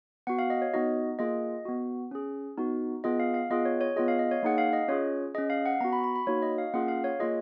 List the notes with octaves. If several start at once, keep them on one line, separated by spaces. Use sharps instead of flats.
B3 F#4 F#5
F5
D#5
C#5
B3 D#4 F#4 D#5
A#3 F4 G#4 D#5
B3 F#4
C#4 G#4
B3 D#4 F#4
B3 F4 G#4 D#5
F5
F5
B3 F4 G#4 D#5
C#5
C#5
B3 F4 G#4 D#5
F5
D#5
C#5
A#3 D#4 G#4 F#5
F5
D#5
C#4 F4 G#4 C#5
C#4 G#4 D#5
F5
F#5
B3 F#4 A#5
B5
C#6
B5
B5
A#3 D#4 F#4 C#5
D#5
F5
A#3 C#4 F4 G#4 F#5
F5
C#5
A#3 F4 G#4 D#5